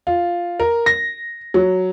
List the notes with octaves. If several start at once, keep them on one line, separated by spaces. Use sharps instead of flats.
F4
A#4
A#6
F#3